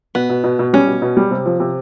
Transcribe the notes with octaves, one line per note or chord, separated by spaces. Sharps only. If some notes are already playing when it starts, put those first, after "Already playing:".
B2 B3
B2
B2
B2
G3 C#4
B2
B2
G3
C3
F3
C3